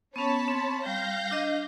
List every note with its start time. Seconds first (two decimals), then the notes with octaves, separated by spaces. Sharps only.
0.16 B3 C#4 C#5 A5 B5
0.48 C4
0.86 G3 F5 G6 A#6
1.31 D4 D#5